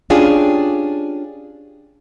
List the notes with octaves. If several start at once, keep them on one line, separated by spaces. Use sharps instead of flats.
C#4 D4 F4 G4 G#4